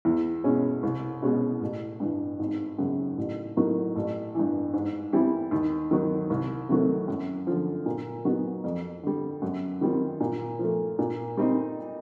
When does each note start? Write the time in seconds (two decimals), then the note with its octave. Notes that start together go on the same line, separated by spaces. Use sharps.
0.05 E2
0.44 B2 G#3 C#4
0.83 C2
1.22 B2 G#3 C#4 F#4
1.61 A1
2.00 G2 E3
2.39 G#1
2.79 F#2 C#3
3.18 A1
3.57 A2 F#3 A#3 D#4
3.96 A1
4.35 G2 E3
4.73 G#2
5.13 E3 G3 C4 E4
5.51 D#2
5.91 D#3 F#3
6.30 C2
6.69 C3 D#3 F#3 A3
7.08 F#2
7.47 D3 F3
7.86 A#2
8.25 F#3 B3 D#4 F#4
8.64 F2
9.03 D3 G3
9.42 F#2
9.81 D#3 G3 C4 F4
10.20 A#2
10.59 F3 A3
10.99 A#2
11.37 G3 C4 D#4